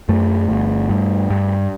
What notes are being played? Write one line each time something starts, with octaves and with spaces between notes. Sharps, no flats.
F#2 A3
G1
G2
G2